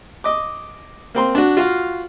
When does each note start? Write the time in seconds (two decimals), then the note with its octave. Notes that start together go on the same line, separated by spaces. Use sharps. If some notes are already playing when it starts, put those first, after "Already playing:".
0.24 D#5 D6
1.15 A#3 C4 C6
1.35 D4 F#4
1.57 F4 F#4 F5